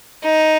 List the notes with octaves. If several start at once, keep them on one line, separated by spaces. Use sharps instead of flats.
D#4